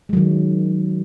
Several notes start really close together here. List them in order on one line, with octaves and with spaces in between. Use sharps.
G#3 F#3 D#3